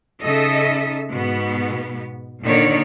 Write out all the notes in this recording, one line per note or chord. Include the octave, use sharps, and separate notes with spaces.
C#3 D#4 A4 D#5 E5
G#2 B2 B3
A#2 D3 D#3 C#5 D5